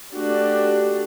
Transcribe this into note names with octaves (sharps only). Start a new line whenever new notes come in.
A3 D4 F#4 G4